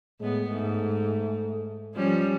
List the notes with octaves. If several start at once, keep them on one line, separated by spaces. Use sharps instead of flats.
A2 G#3 B3
G#2 A3
F3 G3 C#4